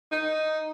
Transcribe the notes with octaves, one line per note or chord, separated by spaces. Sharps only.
D#4